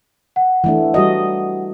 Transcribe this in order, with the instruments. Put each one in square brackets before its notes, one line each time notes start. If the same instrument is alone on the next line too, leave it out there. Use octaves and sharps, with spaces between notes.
[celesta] F#5
[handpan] E3 A3 D4
G3 F#4 D#5